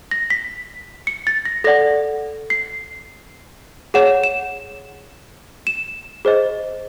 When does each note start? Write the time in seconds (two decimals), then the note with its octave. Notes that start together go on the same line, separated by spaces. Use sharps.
0.11 A#6
0.30 B6
1.07 C#7
1.27 A6
1.45 A#6
1.64 A4 D5 F#5 A#6
2.50 C7
3.94 G#4 C#5 F#5 E7
4.24 E7
5.67 E7
6.25 G#4 C5 D#5